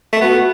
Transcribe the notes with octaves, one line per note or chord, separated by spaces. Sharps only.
A3
B3 F#4
F#4